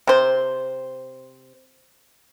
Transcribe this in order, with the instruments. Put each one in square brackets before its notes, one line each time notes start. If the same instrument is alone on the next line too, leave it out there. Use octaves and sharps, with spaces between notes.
[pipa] C3 C5